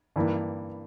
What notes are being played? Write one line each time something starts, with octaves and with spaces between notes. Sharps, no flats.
G2 E3 A#3